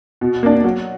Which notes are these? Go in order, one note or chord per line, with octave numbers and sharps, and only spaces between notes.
B2
A#3 D4
F#3